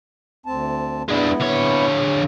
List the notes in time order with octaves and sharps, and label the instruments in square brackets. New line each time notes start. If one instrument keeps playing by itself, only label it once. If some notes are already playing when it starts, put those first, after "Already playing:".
[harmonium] D2 C4 A5
[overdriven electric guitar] G#3 D4 [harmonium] B3 E4
[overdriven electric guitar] D3 C#5